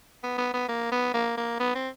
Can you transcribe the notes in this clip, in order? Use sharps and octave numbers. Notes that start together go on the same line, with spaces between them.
B3
B3
B3
A#3
B3
A#3
A#3
B3
C4